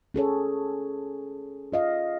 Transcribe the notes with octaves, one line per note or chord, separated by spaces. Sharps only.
C#4 G#4 A4 C#5
F4 D#5 F5